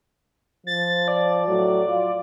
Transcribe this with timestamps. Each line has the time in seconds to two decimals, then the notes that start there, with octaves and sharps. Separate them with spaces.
0.67 F3 A6
1.08 D5
1.47 A2 F#3
1.87 F4